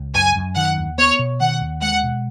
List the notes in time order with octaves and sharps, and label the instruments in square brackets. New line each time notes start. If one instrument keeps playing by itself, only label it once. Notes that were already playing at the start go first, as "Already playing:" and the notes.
Already playing: [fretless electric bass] C#2
[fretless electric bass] F#2 [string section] G#5
[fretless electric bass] F#2
[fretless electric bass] D#3 [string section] F#5
[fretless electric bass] D#2
[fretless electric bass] B3 [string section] C#5
[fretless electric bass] B2
[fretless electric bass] D#3 [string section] F#5
[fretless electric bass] D#2
[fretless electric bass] G#3 [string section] F#5
[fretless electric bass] B2